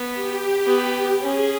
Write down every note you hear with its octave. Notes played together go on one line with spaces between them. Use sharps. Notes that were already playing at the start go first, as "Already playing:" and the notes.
Already playing: B3
G4
B3
C#4 G#4